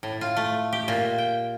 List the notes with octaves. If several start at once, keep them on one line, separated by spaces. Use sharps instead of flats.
A2
F4
A3
G4
A#2
G5